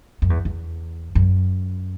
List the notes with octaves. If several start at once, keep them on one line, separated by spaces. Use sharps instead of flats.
F#2
E2
E2
F#2